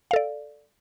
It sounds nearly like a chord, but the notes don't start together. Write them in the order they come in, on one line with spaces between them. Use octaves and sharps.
F5 A4 D5